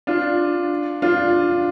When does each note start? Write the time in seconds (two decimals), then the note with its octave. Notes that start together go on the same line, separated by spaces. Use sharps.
0.07 D4 F4
1.02 D4 F4